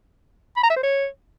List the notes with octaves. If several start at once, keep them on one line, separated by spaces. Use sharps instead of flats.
B5
A#5
E5
C5
C#5